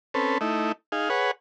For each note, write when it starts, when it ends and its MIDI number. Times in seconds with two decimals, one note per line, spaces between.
0.14 0.38 60
0.14 0.38 61
0.14 0.38 69
0.14 0.38 71
0.41 0.72 57
0.41 0.72 63
0.41 0.72 64
0.92 1.09 63
0.92 1.09 68
0.92 1.09 77
1.10 1.31 68
1.10 1.31 71
1.10 1.31 73
1.10 1.31 78